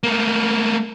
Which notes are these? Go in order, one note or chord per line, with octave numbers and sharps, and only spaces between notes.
A3 A#3